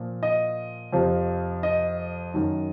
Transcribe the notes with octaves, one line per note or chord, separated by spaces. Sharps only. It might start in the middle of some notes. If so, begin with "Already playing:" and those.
Already playing: A#2 F3
D#5
F2 C3 F3
D#5
F#2 D#3